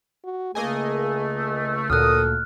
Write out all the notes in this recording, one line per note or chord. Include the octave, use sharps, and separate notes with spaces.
F#4
C#2 C#3 A3 A#3 G#4 D#5 G#5
D2 A#2 F#3 A4 A#4 D#6 F6 F#6